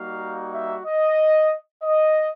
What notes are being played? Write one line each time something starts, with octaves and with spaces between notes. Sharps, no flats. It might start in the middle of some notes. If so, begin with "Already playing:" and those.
Already playing: G3 A#3 D#4 F#4 F5
E5
D#5
D#5